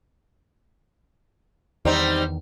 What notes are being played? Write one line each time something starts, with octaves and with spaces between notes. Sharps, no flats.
E2 D#3 G3 C4 D#4